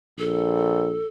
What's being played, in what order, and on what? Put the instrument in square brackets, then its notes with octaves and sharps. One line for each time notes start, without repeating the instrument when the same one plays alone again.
[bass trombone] A#1 [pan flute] A4